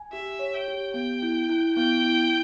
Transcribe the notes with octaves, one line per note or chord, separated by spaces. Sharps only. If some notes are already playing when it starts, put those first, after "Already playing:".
Already playing: G#5
G4 E5
C#5
G5
G4
B3 G5
E4
E4
B3 G5
E4